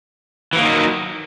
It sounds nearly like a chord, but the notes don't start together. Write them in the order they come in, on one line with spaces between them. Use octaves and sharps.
E3 A#3 D#3 F#3